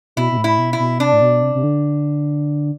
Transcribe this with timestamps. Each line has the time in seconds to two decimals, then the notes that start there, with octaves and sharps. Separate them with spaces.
0.17 B2 E4
0.32 B2
0.37 A2
0.44 E4
0.58 B2
0.73 E4
0.79 B2
1.00 C3 D4
1.13 A2
1.21 B2
1.42 C3
1.55 C3
1.63 D3